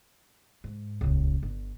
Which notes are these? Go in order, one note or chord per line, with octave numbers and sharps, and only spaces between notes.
G#2
D#1 C#2
G1